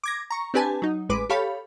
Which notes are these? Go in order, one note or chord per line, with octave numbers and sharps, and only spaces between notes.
D6 G#6 A#6
A#5 C#6
C4 D4 G4 B4 G#5 A5
F#3 D#4
A1 G#3 B4 D6
G4 A4 C#5 F5 B5